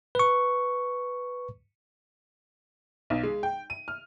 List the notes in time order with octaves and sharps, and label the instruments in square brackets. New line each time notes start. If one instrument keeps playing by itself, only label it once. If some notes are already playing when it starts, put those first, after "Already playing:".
[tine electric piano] B4 C#6
[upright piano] B1
G#3
G5
D#7
F6